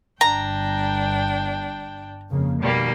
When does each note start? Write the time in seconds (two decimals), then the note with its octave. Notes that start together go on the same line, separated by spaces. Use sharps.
0.21 G1 D4 G5 A#5
2.30 F2 C#3 A#3
2.60 B2 D#3 G3 A#3